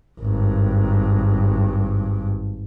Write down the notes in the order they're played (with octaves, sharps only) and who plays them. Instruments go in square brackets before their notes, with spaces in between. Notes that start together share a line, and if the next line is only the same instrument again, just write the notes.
[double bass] G#1 G2